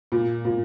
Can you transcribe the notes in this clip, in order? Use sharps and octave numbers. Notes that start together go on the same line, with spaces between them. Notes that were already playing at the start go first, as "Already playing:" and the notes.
A#2
A#2